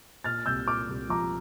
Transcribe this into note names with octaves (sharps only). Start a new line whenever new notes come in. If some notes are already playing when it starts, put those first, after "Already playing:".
A#2 F6 A6
C2 E6 G6
A#2 D6 F6
C2
F3 A#5 D6